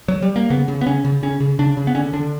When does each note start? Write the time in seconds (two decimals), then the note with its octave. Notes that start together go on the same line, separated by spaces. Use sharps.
0.08 F#3
0.22 G3
0.36 A#3
0.50 C#3 B3
0.68 C#3
0.81 B3
0.86 C#3 C#4
1.05 C#3
1.23 C#3 C#4
1.40 C#3
1.59 C#3 D4
1.77 C#3
1.87 B3
1.95 D3 C#4
2.13 D3 D4